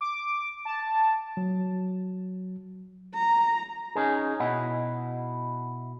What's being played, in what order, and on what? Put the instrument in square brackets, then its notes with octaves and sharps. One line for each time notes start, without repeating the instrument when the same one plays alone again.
[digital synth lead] D6
A5
[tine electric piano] F#3
[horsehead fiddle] A#5
[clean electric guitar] C#4 D#4 G#4
B2 E4 D#5 F#5